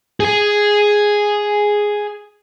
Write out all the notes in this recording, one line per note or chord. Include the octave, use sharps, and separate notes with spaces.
G#4 G#5